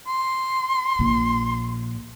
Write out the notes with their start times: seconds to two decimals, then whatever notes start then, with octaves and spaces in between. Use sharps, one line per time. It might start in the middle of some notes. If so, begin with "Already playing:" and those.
0.07 C6
0.99 A#1 A#2